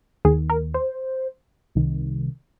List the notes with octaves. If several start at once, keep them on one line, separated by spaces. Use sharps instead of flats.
D#2 D#3 G#4
A#4
C5
C2 C3 D#3